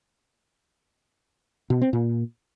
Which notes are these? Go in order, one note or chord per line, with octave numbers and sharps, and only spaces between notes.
B2
C4
A#2